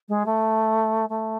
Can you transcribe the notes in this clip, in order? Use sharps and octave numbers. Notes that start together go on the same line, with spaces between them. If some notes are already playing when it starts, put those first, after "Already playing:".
G#3
A3
A3